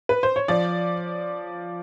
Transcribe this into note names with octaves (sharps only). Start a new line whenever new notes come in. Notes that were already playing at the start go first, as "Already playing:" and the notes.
B4
C5
C#5
F3 D5